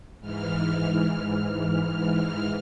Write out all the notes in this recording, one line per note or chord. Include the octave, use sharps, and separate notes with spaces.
G#2 E3 F6